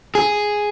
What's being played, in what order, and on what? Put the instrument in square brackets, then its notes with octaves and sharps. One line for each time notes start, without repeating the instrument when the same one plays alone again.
[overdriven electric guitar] G#4